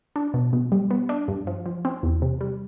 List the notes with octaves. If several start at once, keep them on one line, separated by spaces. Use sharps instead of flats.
D4
B2
B2
G3
B3
D4
G2
F3
F3
C4
E2
C3
G3